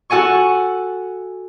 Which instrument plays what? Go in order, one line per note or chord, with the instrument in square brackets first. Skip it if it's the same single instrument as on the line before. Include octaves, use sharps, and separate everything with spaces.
[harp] F#4 A4 F#5 G#5 C#6